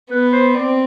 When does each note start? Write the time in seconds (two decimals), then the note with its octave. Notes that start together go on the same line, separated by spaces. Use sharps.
0.11 B3 B4
0.33 C5
0.54 C4 D5